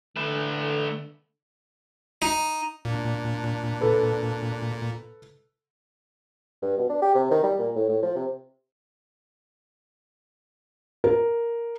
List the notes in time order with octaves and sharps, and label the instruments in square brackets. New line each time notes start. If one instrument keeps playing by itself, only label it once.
[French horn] D3 [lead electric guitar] A3 B4
[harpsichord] D#4
[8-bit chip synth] A#2 [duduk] D4
[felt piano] A4 B4
[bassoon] G2
B2
D4
G4
C3
D#3
G3
A#2
A2
A2
F3
C3
[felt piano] A#4